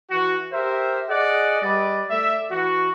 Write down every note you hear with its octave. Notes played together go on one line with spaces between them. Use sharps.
E3 F#4
G4 A#4 C5 E5
G#4 D5 D#5 F#5
G3 B4 D5 D#5
A3 D5 E5
E3 F#4